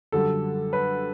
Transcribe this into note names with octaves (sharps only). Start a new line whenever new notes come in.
F#2 D3 G3 A4
B4